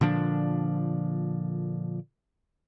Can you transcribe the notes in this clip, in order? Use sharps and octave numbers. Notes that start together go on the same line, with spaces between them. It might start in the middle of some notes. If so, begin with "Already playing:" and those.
A#2 D3 F3 D4